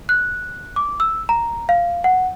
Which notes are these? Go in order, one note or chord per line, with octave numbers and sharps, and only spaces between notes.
F#6
D6
E6
A#5
F5
F#5